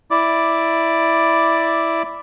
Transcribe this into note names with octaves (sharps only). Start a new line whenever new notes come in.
E4 D5 D6